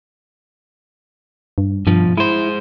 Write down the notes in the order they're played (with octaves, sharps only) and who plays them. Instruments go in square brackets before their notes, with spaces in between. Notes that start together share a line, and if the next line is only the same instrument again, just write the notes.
[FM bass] G2
[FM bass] G2 [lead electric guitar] B2 F3
[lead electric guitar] G#3 C5 [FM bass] E4